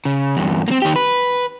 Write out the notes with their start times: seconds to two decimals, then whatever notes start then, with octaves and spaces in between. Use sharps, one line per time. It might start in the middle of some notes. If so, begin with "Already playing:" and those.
0.05 C#3
0.37 E2 G2
0.68 A#3 C4
0.82 D#3 G4
0.96 B4